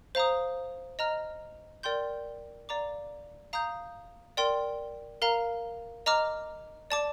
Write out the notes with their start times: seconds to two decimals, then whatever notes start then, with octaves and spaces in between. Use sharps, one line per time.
0.15 C5 F5 A#5 D#6
0.99 D#5 A#5 F6
1.83 A#4 D5 G5 C6 G6
2.69 D5 F5 A#5 D6
3.53 F5 A#5 D#6 G6
4.37 A#4 D5 G5 C6
5.22 A#4 F5 A#5
6.06 D#5 A#5 D6 F6
6.90 D5 A5 D6